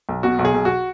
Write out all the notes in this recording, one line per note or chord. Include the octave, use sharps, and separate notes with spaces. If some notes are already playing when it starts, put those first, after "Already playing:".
B1
B2 F#4
B1
G#4
B1
F#4